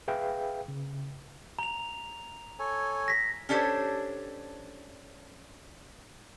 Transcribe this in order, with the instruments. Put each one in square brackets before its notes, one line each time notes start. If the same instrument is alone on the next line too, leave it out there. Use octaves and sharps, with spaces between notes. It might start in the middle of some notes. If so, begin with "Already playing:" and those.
[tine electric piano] G#4 B4 E5 F5 G5
C#3
[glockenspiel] A#5 F7
[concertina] A4 C#5 G#5
[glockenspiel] A#6 B6
[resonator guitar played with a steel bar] C#4 D4 G4 A4 C5 C#5